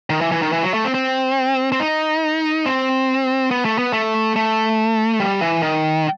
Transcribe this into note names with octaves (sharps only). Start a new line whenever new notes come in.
D#3
E3
E3
D#3
E3
F#3
A3
C4
C4
C4
D#4
C4
B3
A3
B3
A3
A3
G3
E3
D#3